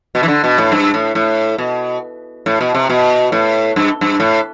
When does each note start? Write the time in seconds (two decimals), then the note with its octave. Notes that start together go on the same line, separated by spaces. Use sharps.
0.15 B2
0.23 E3
0.28 D3
0.44 B2
0.58 A2
0.72 G2
0.94 A2
1.15 A2
1.58 B2
2.46 A2
2.61 B2
2.75 C3
2.90 B2
3.32 A2
3.76 G2
4.01 G2
4.20 A2